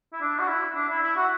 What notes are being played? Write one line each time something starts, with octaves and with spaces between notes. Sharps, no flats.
E4
D4
F#4
E4
D4
E4
E4
F#4